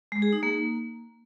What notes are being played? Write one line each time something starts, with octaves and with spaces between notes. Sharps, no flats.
G#3
G#4
D#4
A#3